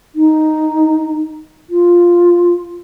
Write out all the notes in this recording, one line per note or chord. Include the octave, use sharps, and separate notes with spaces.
D#4
F4